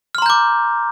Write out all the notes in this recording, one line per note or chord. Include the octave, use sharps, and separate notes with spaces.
A#5 C6 D6 F6 G6